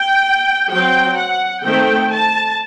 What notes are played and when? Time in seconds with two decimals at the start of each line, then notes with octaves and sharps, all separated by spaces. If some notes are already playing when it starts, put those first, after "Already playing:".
Already playing: G5
0.70 F#3 C4 G5
1.17 F#5
1.64 D#3 A3 C4 G5
2.12 A5